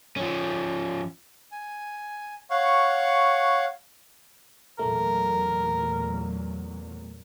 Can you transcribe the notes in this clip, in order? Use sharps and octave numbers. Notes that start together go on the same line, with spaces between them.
F3 C#4
G#5
C#5 F5 F#5 C#6
E2 A#2 F#3 A3 A#4